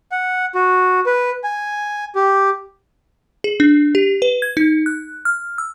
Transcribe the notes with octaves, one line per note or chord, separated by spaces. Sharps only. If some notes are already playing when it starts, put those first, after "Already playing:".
F#5
F#4
B4
G#5
G4
G#4
D4
G4
B4
G#6
D#4
F#6
F6
E6